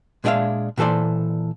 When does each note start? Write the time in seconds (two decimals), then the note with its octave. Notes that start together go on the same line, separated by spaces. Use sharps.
0.24 A#2 G#3 D4 D5 E5 F5
0.78 A#2 E3 A4 C5 D5